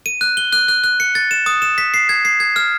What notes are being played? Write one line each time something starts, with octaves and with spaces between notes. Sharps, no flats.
D#7
F#6
G7
F#6
F#6
F#6
C#7
A6
E7
D#6
E7
B6
C7
G#6
C7
G#6
F6